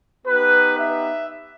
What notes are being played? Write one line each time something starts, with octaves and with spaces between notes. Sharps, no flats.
B3 D#4 G4 B4
E5